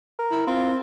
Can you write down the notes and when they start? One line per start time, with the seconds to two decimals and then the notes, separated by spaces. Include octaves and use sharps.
0.19 A#4
0.31 E4
0.47 C4 F4